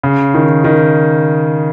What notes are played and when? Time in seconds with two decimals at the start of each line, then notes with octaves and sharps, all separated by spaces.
0.03 C#3
0.34 D#3
0.64 D#3